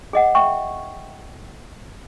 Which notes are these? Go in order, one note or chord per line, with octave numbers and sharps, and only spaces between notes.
G#4 D#5 F#5
E5 G5 C#6